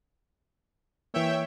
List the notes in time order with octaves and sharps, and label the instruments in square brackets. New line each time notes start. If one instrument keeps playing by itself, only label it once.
[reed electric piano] E3 A#3 [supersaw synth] C#5 E5 G5